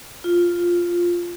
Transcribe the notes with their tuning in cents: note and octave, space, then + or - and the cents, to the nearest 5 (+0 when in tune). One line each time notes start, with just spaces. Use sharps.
F4 +0